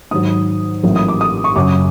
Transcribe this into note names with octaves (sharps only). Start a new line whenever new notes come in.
G#2 D#3 F#3 D#6
A1 A2 F#3 A#3
D#6
D6
D#6
C#6
F#2 C#3 F#3 D6